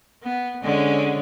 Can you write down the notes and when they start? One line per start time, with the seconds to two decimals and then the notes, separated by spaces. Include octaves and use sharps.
0.23 B3
0.63 D3 G#3 C#4